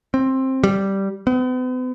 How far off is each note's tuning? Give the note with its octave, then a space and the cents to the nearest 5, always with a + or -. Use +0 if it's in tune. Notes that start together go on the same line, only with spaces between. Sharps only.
C4 +15
G3 -5
B3 +45